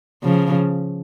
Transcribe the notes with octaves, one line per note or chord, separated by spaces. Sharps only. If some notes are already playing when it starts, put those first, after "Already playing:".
C#3 F3